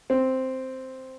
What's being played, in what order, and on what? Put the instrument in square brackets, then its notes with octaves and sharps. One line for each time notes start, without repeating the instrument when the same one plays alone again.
[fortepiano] C4